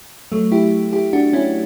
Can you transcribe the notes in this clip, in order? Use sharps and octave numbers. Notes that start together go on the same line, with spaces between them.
F#3 A3
E4 G4
E4 G4
D4 F#4
C#4 E4